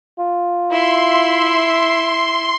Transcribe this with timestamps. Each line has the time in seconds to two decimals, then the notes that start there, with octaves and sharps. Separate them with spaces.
0.19 F4
0.71 E4 E5 C6